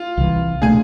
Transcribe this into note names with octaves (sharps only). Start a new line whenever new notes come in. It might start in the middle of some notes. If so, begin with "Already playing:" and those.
Already playing: F4 F5
C2 C3 E3
B2 A3 D4 G#4 G#5